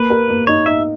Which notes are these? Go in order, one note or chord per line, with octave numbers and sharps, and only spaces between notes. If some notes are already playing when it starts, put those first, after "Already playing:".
Already playing: A#3 B4
A#4
A#3
D#4 C#5
D#4 E5